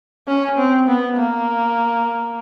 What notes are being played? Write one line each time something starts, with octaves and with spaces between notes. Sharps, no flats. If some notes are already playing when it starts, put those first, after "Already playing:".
C#4
C4
B3
A#3